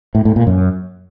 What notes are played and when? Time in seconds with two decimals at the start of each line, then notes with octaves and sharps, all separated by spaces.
0.15 A2
0.25 A2
0.36 A#2
0.47 F#2